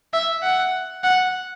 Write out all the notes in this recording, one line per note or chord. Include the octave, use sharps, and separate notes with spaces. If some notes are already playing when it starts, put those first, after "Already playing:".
E5
F#5
F#5